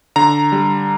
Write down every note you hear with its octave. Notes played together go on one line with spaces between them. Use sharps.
D3 A#5
G3